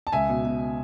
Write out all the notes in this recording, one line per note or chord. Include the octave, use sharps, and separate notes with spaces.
A5
C#2 E5 G#5
B2
B2